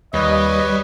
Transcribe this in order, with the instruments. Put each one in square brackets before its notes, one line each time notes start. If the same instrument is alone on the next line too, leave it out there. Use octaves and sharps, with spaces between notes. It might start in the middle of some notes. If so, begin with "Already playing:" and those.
[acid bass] D#2 [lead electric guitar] G3 [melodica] B4 C#5 [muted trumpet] D#5